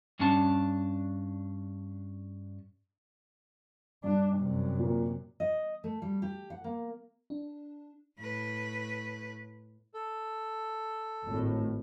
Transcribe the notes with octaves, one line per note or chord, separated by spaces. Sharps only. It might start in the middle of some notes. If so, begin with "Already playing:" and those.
G2 C#4 D4 A5
G2 D4
F#2 C3
A#2 A#3
D#5
A3
G3
G4
F#5
A#3
D4
A2 B4
A4
G#1 A2